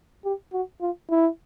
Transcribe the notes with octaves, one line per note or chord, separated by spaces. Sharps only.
G4
F#4
F4
E4